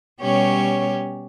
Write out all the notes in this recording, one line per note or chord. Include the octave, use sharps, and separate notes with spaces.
B2 G3 C#4 G4 C#5